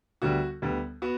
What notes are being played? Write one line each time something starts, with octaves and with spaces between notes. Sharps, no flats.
D2 D3 G3 B3 F#4
D2 D3 G3 B3
B3 F#4